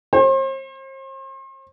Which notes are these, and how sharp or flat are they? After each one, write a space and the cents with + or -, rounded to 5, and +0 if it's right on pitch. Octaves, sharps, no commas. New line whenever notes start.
C5 +40